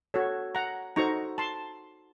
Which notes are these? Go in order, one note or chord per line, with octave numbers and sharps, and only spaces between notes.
F#4 A4 C#5
F#5 A#5
D#4 F#4 A4 C5 A#5 C#6
A5 C6